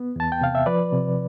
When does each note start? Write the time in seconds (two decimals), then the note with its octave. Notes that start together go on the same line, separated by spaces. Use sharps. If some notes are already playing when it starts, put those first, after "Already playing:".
Already playing: B3
0.16 E2 A5
0.32 G5
0.41 C3 F5
0.55 E5
0.66 F3 B4 D5
0.92 C3